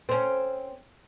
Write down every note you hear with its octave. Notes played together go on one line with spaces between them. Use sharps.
C4 C#4